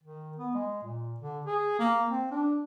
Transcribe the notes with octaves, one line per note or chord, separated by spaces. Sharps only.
D#3
B3
G#3
A#2
D3
G#4
A#3
C4
D4